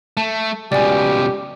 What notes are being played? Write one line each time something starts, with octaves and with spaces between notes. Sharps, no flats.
A3 A5
C#2 B2 G4 D5 G#5